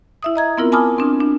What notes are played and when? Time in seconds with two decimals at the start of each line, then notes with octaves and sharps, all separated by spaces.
0.23 E4 E5 D#6
0.36 D#5 A#5 G#6
0.58 B3 C4 E4 F4 A#4
0.72 G#5 A5 B5 D6 D#6 F6
0.98 C4 D4
1.20 D4